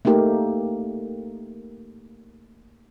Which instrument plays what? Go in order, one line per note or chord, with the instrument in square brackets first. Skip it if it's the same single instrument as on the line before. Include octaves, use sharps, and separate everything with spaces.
[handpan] A3 A#3 D#4 G4 A#4